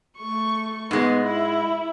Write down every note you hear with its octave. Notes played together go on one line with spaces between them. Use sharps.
A3 C#6
G#2 G#3 B3
E4